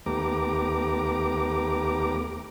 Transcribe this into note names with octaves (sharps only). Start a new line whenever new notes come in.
D#2 A3 B3 G4 A#5 D6